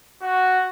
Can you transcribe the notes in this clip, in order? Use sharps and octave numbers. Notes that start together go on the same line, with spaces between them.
F#4